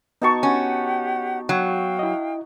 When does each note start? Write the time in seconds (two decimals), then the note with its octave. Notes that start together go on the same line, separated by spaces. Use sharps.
0.22 B3 D#4 F#4 A5 C#6
0.43 C#4 G4 F#5
1.49 F#3 F5 G5
1.99 E4 D#5